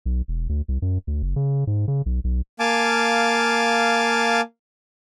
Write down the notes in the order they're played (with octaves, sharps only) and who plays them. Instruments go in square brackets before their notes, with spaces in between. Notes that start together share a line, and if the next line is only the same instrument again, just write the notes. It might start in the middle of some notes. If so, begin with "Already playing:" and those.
[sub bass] B1
E1
D2
C2
F#2
D2
F#1
C#3
G#2
C#3
B1
B1
[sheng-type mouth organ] A#3 F5 G#5 A5 D6